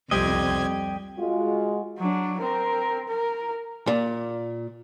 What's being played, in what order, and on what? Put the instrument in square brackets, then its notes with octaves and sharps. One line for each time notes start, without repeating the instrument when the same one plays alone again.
[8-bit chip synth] C2 C4 G#6 [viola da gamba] F2 [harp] G3 [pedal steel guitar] G4 D#5
[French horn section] G#3 F4 F#4
[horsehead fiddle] F#3 D4
C4 A#4
A#4
[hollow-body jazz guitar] A#2